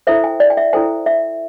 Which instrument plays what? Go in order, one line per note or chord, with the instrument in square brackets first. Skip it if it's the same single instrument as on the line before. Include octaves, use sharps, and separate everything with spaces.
[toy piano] E4 A4 C5 E5
G5
D5
G5
E5
E4 A4 C5 G5
E5